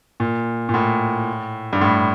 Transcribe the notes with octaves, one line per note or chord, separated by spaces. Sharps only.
A#2
A#2
A2
G2
A2